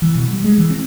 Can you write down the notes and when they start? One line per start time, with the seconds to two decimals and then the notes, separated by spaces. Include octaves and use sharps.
0.02 E3
0.15 B2
0.28 G3
0.44 G#3
0.58 E3
0.71 C4